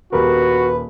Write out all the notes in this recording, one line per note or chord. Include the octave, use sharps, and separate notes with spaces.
D#1 F#4 G4 A#4 B4